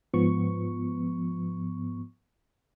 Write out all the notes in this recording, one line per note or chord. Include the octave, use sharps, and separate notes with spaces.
G#2 F3 B3 C#6